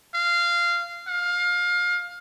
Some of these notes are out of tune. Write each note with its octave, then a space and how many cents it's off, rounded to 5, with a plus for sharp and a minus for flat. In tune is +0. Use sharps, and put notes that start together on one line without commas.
F5 -15
F5 +25